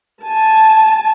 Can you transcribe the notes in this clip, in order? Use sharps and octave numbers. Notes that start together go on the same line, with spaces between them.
G#5 A5